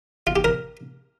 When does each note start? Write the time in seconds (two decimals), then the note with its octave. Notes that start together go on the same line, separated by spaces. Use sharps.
0.27 F4
0.36 G4
0.44 A#4